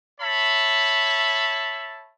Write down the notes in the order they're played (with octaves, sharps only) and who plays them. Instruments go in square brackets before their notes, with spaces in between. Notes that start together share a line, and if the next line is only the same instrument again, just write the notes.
[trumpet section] C#5 E5 A5 B5